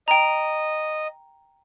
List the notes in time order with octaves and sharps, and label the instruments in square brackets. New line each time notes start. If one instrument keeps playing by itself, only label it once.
[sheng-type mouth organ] D#5 [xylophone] G5 A#5